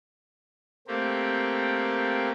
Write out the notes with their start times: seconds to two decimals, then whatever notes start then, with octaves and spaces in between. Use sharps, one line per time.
0.87 A3 A#3 C4 G4